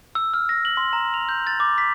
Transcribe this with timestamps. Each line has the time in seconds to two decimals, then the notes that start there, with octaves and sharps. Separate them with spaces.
0.15 E6
0.34 F6
0.49 A#6
0.65 F#7
0.77 C6
0.93 A#5
1.14 F7
1.29 G6
1.47 A6
1.60 D6
1.78 B6